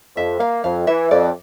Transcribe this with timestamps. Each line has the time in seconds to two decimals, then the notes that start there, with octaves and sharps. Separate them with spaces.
0.16 F2 E5
0.40 A#3 F5
0.64 F2 F5
0.87 E3 E5
1.11 F2 D5